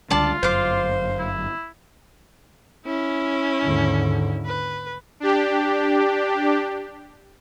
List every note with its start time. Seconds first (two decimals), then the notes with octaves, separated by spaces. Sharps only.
0.11 C#2 D3 G3 D4 F4 D5 A5
0.43 G1 F#2 C5 F5 D6
1.18 E4
2.85 C#4 E4
3.63 D#2 G#2 D3
4.46 B4
5.20 D4 G4